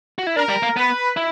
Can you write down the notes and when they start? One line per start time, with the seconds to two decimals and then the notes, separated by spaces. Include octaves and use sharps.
0.19 F#4
0.27 E4
0.36 D4 A#4
0.49 G3
0.63 A#3
0.76 B3 B4
1.17 E4